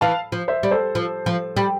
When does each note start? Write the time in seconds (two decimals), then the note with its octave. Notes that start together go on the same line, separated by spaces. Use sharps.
0.01 E3 F5 A5
0.32 F3
0.48 C5 E5
0.63 G3 D5
0.71 A4 C5
0.95 F3
1.26 F3
1.57 G3